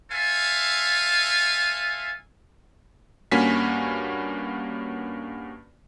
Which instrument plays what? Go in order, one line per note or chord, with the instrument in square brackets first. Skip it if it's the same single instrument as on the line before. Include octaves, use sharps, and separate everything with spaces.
[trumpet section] A4 C5 E5 F5 G#5
[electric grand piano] G2 A#3 C#4 F#4 G#5 B6